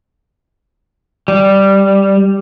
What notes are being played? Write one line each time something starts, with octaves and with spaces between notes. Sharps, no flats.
G3